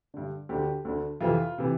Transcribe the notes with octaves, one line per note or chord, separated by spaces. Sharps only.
G2 D3
D2 D3 G4
D2 D3
F2 C3 E3 F4
C3 E3